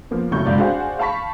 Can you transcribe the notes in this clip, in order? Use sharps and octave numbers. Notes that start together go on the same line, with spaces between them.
F3 A#3 B3
F1 C#3 F#3 E4 C#6 G6
G#1 C#2 D5
D4 F#4 G#4 C5 F5 F#5
F5 A5 B5 C#6 B6